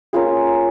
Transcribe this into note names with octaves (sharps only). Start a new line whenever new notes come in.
A#3 C#4 F4 G#4